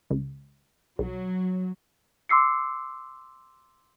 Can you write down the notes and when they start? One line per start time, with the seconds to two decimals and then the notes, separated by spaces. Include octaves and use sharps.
0.10 C#2
0.99 B1 F#3
2.29 C6 D6 E6 C7 C#7